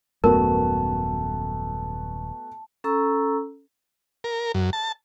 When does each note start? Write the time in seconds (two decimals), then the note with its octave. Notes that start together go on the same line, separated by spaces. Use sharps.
0.24 D#1 F#2 A3 B3 F#4 A#4 A5
2.84 C#4 A4 A#5 C#6 E6
4.24 A#4
4.54 F#2
4.73 A5